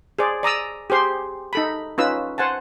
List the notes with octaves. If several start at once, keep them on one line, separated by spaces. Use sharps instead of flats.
G#4 C5 D5
D5 A#5 D#6 E6
G4 G#4 C5 C6
D#4 A4 B5
C#4 D#4 F4 B4 E6
C5 F#5 G#5 A5